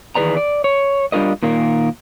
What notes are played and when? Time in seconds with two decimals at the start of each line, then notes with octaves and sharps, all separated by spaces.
0.15 D#3 E3 G#4 B4 D5 A#5
0.37 D5
0.64 C#5
1.12 G3 D4 F4 A#4 D#5
1.43 A#2 D#3 A#3